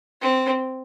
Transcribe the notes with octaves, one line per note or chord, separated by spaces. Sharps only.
C4